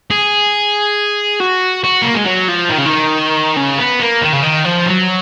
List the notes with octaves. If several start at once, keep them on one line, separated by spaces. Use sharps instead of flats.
G#4
F#4
F#4
A#3
G#3
F#3
F3
D#3
C#3
D#3
C#3
B3
A#3
D#3
C#3
D#3
F3
F#3